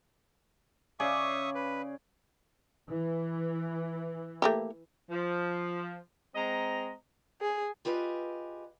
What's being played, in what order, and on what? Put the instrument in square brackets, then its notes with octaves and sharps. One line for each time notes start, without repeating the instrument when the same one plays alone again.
[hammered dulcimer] C#3 G#4 D5 [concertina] E5 C#6 D#6
[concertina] B4
[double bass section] E3
[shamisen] A3 A#3 G4
[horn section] F3
G#3 C4 D#5 A#5
[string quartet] G#4
[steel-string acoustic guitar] F4 G4 G#4 B4 D#5 F5